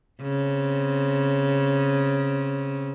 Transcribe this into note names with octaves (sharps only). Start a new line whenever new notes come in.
C#3 C4